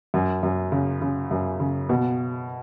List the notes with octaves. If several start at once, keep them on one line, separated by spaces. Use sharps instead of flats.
F#2
F#2
C#3
C#3
F#2
C#3
B2